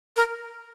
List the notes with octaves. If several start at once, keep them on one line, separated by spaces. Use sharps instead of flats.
A#4